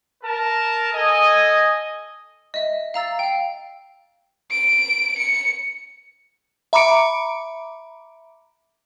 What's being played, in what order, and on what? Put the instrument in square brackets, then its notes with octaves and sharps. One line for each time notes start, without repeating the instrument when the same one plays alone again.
[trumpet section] A#4 A5
A4 D#5 G#5 D#6
[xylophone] D#5 E5
F5 A#5 E6 A6
F5 G5
[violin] D7
C#7
[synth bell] E5 A#5 B5 D6 C#7 D7